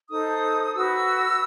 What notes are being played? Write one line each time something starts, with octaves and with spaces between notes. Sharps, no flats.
D#4 A4 C5 D#6
F#4 B4 E6